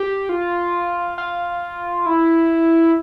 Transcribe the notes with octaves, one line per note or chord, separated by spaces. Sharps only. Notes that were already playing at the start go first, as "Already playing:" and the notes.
Already playing: G4
F4
F4
E4